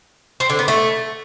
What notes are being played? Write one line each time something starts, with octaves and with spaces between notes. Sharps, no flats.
C4
D3
B3
A3